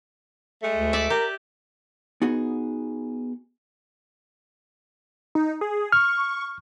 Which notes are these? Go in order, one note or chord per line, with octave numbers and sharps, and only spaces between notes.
G#3 A3
D2
D5 E5
G4 A#4
B3 D#4 F#4 G#4
D#4
G#4
C#6 F6